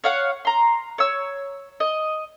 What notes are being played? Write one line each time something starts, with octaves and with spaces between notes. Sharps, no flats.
C#5 F5 F#5
A#5 C6
C#5 E6
D#5